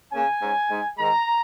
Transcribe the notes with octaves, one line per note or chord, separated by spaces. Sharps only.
C#3 A#3 C#4 G#5
G#2 G#3 C#4
G#2 G#3 D#4
G#2 D#3 G#3 A#5